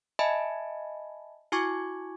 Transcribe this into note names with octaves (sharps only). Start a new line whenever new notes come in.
D#5 E5 G#5 A5 B5
E4 F#4 G#5 C#6 D6 G#6